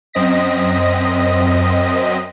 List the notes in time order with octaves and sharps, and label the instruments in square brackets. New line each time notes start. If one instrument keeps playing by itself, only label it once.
[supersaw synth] F#2 C4 D#5 A#6 B6